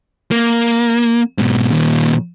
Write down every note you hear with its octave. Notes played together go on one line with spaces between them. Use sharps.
A#3
G#2 B2
D#2 A#2